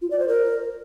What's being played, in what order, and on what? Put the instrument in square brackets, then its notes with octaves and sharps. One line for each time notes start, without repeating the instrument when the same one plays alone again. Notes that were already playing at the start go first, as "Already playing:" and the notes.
[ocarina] F4
D5
C5
A#4